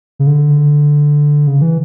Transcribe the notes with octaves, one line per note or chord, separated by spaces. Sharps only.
C#3
D3
C#3
E3